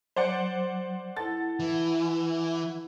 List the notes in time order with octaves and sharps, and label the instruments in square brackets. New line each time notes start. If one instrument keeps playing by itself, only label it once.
[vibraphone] F#3 [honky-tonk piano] C5 D5 F#5
[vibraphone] E4 F#5 [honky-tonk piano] A4 A6
[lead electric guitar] E3